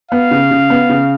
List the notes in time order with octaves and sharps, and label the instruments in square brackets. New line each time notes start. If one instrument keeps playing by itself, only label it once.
[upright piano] B3 [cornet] F5
[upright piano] C#3
C#3
B3
C#3